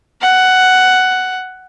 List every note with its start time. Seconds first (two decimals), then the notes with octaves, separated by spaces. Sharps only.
0.21 F#5